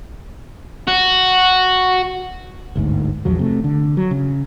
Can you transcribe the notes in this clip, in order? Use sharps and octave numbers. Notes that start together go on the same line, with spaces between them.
F#4
G1 D2 G#2
A#1 E2 F3 F#3
C3 A3
D3
F#3
C#3